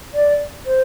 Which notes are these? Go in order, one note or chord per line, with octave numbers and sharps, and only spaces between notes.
D5
C5